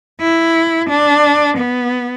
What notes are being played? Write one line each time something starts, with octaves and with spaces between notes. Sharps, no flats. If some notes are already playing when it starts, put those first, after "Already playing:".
E4
D4
B3